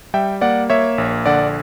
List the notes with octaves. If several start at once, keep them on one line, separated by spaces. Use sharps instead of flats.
G3 E5 G5
A#3 D5 F#5
A#3 C#5 E5
A#1
D3 D5 F#5